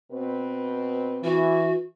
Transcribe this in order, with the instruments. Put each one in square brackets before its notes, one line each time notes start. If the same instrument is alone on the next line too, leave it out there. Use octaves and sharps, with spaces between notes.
[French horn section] B2 C4 B4
[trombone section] E3 [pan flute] F#4